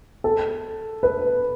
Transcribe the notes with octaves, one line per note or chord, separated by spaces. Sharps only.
A4
B4